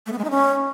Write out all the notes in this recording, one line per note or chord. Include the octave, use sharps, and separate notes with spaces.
A3
B3
G#3
D#4
C#4